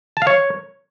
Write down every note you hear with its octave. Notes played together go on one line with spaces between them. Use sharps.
A5
F5
C#5